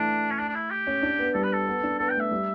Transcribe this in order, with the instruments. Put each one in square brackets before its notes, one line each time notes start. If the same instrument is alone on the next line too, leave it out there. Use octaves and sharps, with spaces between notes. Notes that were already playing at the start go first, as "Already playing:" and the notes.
Already playing: [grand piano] E3 A3 [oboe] D4
[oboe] C#4
D4
D4
E4
G4
[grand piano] C#4
D4
B3
[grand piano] G3 [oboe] A4
[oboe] B4
A4
[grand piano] B3
D4
[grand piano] B3 [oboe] A4
[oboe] G5
[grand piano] A3 [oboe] E5
[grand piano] G3